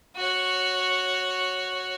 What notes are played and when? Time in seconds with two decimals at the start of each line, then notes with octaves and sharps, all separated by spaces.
0.16 F#4 C#5